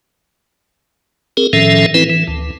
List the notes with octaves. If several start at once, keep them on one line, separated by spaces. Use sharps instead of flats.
C4 G#4 A#4
A2 D#3 F3 C#4 A4 E5
E3 C4 E4 B4
E3
D2